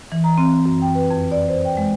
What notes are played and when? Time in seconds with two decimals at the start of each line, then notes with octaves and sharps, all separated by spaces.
0.12 E3
0.24 A#5
0.38 C4
0.66 F#2
0.82 G5
0.95 B4
1.10 F2
1.32 D5
1.48 C5
1.65 G5
1.77 G#3